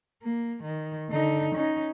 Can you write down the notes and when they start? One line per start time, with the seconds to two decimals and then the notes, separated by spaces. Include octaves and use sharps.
0.23 A#3
0.63 D#3
1.09 D3 D#4
1.55 C#4 D#4